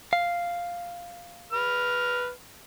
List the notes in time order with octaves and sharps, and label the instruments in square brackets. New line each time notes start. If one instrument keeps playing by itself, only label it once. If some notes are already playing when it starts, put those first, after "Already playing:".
[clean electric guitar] F5
[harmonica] B4 F6